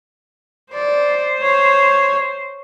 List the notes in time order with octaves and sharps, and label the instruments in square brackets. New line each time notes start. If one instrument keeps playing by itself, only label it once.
[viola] C5 [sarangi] D5
[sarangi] C#5